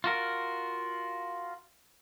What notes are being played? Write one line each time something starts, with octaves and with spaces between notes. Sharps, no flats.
F4 F#4 A#4